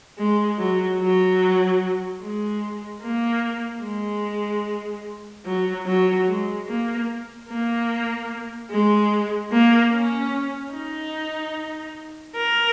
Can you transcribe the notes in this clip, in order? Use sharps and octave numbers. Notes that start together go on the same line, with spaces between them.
G#3
F#3
F#3
G#3
A#3
G#3
F#3
F#3
G#3
A#3
A#3
G#3
A#3
C#4
D#4
A#4